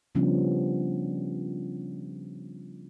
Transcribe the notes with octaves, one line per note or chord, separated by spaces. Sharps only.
C#3 F3 G3 B3 C#4 D4